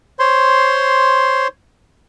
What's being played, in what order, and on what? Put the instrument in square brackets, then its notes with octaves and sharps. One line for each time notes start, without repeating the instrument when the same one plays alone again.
[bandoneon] C5 C#5 C6